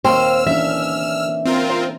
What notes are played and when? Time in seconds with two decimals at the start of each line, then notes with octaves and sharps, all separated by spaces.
0.04 D#2 A#3 C4 C5 G5 E6 F6
0.47 E3 C#4 D4 E5
1.45 C4 F4 A#4
1.70 C5